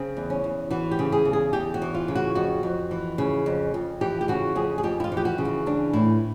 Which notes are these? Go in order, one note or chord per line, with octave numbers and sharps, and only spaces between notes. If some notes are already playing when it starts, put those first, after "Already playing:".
Already playing: C#3 C4
E2
C#4
E2
E3 F#4
G4
C#3
G#4
E2
G#4
E2 G4
F#4
E3
F4
C#3
F#4
F2 F#4
F2
E3
C#3
F2
F2
E3 G4
G4
C#3 F#4
F2 G#4
G#4
F2 G4
E4
F4
E3
G4
F#4
C#3
F#4
E3 D4
A2 E4